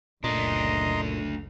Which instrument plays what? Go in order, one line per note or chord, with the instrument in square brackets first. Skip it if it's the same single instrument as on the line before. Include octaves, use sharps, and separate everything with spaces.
[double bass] F#1 C#2 [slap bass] A#2 [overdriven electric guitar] A3 D4 [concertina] D#5 A#5 C6